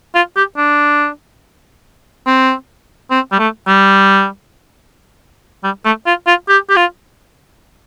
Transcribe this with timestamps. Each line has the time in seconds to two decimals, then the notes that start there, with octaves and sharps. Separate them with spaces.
0.15 F4
0.37 G4
0.57 D4
2.27 C4
3.11 C4
3.32 G3
3.39 A3
3.67 G3
5.64 G3
5.85 A3
6.07 F4
6.27 F4
6.49 G4
6.70 G4
6.77 F4